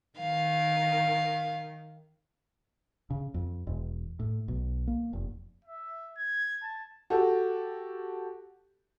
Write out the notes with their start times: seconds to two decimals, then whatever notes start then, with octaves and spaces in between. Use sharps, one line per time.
0.18 D#3 F5
3.10 C#3
3.34 F2
3.67 E1
4.20 A2
4.48 B1
4.87 A#3
5.13 F1
5.65 E5
6.17 G#6
6.63 A5
7.10 F#4 G4 A4